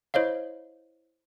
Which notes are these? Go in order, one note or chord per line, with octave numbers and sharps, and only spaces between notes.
E4 C5 C#5 D#5 F5